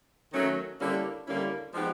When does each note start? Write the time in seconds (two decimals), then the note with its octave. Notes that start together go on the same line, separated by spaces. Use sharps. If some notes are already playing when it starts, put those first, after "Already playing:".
0.33 D#3 F#3 A3 C#4
0.80 D3 G3 A#3 C#4 E4
1.27 D3 G3 A#3 C#4 E4
1.74 F3 G#3 B3 D#4 G4